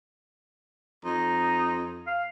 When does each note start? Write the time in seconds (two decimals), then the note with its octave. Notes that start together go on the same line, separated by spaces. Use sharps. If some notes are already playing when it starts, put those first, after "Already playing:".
1.05 F2 D#4
2.07 F5